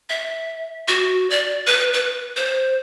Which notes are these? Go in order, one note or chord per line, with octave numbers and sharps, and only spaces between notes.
E5
F#4
D5
B4
B4
C5